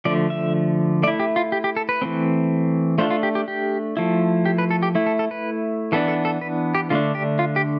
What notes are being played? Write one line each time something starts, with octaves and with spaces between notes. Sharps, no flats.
D3 F3 A3 D5
E5
A3 E4 D5
G4
F4
G4
G4
A4
B4
E3 A3 C4
A3 D4 F4 C5
F4
G4
G4
G4
F3 A3 E4
G4
B4
A4
G4
A3 E4
A4
A4
B4
E3 B3 D4 A4
A4
A4
B4
G4
D3 A3 D4 F4
G4
F4
G4